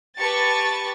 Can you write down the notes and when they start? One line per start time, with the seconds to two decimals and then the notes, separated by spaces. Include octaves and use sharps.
0.18 G4 B4 A5 C#6 A6